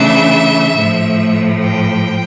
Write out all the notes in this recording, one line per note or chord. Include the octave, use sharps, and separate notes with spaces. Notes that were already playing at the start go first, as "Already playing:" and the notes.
Already playing: C#3 E3 A3 D4 E5
A2 F3 A3
G5